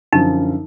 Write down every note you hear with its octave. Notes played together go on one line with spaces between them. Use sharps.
F#2 D3 F3 D#4